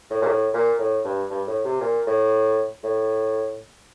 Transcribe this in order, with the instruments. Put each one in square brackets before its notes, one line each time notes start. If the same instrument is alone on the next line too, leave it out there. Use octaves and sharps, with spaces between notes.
[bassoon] A2
A#2
A2
A#2
A2
G2
G2
A2
C3
A#2
A2
A2